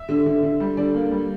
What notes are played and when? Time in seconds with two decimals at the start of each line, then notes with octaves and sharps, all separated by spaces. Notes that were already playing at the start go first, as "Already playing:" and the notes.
Already playing: E5
0.09 D3
0.26 D3
0.43 D3
0.60 G3
0.77 D3 D5
0.94 A#3
1.11 G3